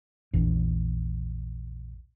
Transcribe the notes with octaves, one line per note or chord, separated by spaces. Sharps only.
A#1 E2